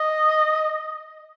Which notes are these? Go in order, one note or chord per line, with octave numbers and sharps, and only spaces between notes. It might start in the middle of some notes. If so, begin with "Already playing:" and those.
Already playing: D#5